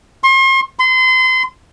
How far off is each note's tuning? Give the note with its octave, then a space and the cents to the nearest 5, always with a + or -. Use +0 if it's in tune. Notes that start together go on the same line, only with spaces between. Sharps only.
C6 +40
C6 -30